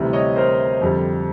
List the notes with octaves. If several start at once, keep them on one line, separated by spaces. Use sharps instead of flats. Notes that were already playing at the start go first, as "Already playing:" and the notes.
Already playing: D2 C3 E3 G3
C#5 D#5
A#4 C5
F2 D3 G3